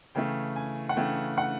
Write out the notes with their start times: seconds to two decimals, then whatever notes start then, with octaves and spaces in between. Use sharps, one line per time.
0.15 C#3 E3 A3 G5
0.56 G#5
0.89 F#5
0.97 C#3 E3 A3 G5
1.38 F#5